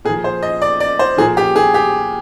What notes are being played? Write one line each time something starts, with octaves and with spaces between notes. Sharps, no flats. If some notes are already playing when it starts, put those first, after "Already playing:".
A#2 F3 G#4
C5
D#5
D5
D5
C5
A#2 F3 G#4
G4
G#4
G4